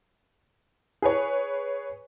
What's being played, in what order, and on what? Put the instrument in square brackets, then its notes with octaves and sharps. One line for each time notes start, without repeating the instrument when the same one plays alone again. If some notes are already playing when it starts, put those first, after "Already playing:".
[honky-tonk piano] G#4 B4 C#5